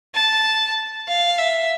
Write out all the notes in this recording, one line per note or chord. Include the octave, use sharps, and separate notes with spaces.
A5
F5
E5